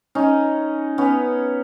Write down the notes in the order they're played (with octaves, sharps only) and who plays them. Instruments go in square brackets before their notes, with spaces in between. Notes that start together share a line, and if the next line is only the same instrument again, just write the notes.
[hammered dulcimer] C#4 D#4
B3 C#4